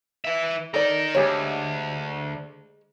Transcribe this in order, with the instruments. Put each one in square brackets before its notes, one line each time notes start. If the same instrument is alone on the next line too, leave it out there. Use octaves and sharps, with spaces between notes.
[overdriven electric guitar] E3 E5
[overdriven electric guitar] D#4 A#4 [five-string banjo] A4 D5
[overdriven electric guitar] D2 [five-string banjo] G#3 G4 C#5